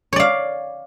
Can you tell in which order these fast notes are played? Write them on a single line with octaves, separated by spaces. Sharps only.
C#5 D5 F5